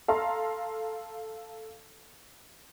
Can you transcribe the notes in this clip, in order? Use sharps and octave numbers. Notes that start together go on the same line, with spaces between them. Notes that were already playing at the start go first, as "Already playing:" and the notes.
A4 F5 A#5 C6